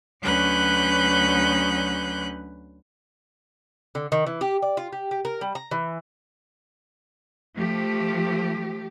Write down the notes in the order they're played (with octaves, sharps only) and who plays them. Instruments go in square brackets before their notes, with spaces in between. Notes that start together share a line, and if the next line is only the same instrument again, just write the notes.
[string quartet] D2 F#3 C#4 B4 F#6 G6
[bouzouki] D3
D#3
E3
G4
D5
F4
G4
G4
A#4
G3
A#5
E3
[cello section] F3 A3 G4